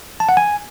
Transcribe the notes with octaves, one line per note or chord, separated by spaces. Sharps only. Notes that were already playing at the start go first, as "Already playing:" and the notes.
A5
F#5
G#5